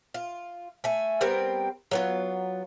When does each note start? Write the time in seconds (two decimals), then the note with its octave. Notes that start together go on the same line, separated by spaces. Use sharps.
0.14 F4
0.84 A3 G#5
1.21 G3 B3 C4 A#4
1.91 F#3 B3 F4